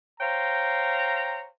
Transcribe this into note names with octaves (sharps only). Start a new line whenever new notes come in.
C5 C#5 F5 G5 A#5